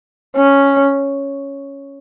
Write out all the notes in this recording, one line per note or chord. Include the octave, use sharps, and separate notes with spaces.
C#4